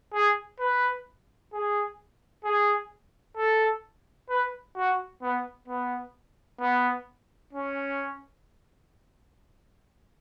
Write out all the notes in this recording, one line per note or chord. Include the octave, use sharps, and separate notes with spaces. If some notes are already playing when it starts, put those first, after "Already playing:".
G#4
B4
G#4
G#4
A4
B4
F#4
B3
B3
B3
C#4